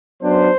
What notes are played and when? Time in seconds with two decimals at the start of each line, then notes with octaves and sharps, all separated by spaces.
0.21 F#2 F#3 B3 D4 C5